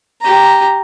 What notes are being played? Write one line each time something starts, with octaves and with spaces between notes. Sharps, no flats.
G4 A#5